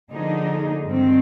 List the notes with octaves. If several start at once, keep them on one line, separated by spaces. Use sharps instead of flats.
D3 F3 A#3 D#4 G#4
G2 D#3 G#3 C4